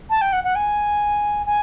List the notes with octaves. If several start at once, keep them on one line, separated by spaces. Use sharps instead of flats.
A5
G5
F#5
F#5
G#5
G#5